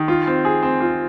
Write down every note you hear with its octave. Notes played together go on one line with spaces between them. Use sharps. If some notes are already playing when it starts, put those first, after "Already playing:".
Already playing: D#3
F4
C4
G#4
C4
F4